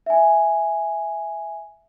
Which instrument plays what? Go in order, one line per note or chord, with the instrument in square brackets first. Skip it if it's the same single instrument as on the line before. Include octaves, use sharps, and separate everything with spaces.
[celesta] E5 G#5